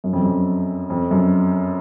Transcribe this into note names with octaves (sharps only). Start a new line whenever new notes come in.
F#2
F2
F#2
F2
F#2